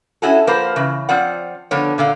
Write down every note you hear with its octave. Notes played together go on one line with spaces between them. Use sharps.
C#4 E4 F#4 G#4 A4
F3 A#3 B4 C5
C#3 E3
F3 C4 F4 D5 F#5
D3 F3 B3 C#5
A#2 D3 F5